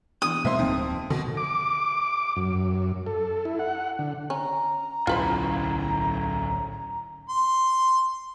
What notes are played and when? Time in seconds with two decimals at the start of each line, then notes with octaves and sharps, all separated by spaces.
0.22 E3 B3 D4 D#6
0.45 B2 G#3 A#3 C4 C5 E5 C6
0.59 D1 F2 F3 A3 D#4
1.10 B2 D3
1.37 D6
2.36 F#2
3.06 A4
3.45 E4
3.59 F#5
3.99 D3
4.30 C#4 A#5
5.07 D1 B1 C#3 E3 C#4 F4 B4 C5
7.29 C6